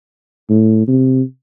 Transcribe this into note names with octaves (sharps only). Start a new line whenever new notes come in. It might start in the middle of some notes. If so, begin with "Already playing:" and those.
A2
C3